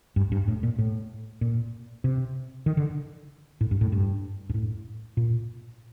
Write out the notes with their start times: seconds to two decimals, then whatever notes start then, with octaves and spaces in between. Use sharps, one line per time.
0.16 G2
0.32 G2
0.48 A2
0.63 A#2
0.79 A2
1.41 A#2
2.04 C3
2.66 D#3
2.77 D3
3.61 A2
3.71 G2
3.81 A2
3.92 G2
4.49 G2
4.54 A2
5.17 A#2